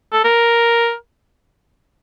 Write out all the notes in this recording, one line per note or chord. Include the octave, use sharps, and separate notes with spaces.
A4
A#4